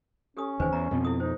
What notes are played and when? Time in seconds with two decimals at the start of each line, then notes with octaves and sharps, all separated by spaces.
0.37 C#4 G4 A4 D#6
0.60 F1 E2 D#3 B4 C5 G#5
0.73 E2 A#5
0.91 F2 B2 F3 C4
1.05 E4 A4 D#6
1.20 D#4 C5